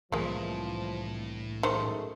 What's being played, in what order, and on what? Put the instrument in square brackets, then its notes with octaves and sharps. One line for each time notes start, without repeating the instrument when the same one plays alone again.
[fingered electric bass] C2 E3 G3 [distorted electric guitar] A2 E4 [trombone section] F3 [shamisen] G#3 A#3
[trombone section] F#2 G#3 A3 [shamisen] D#3 C5